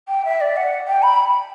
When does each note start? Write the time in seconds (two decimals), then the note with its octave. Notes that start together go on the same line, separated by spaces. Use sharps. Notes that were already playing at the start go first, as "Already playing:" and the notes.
0.08 G5
0.25 E5
0.41 D5
0.56 F#5
0.87 G5
1.02 B5